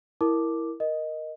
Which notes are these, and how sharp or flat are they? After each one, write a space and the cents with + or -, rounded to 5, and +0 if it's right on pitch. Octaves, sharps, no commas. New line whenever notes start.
E4 +0 A#4 +0 D6 +0
A#4 +10 D#5 +0